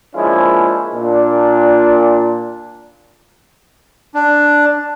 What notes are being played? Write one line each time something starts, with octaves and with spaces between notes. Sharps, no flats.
F3 G#3 A#3 C#4 D4 E4
A#2 D4
D4